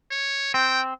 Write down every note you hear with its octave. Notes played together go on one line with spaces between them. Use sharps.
C#5
C4 G5